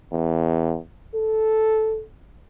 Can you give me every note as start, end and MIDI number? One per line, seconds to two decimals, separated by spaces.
0.12 0.78 40
1.14 2.03 69